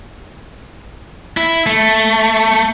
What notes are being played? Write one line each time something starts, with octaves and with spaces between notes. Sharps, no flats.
E4
A3